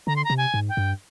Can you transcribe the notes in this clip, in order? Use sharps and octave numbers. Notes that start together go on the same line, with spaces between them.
D3 A#5
C6
A#5
C3
G#5
G#2
G5
G2